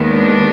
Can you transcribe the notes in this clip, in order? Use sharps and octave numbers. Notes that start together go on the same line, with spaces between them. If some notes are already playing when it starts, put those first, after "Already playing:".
Already playing: D#2 D#3 G#3 B3
D4